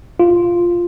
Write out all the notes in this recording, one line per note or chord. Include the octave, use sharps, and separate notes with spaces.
F4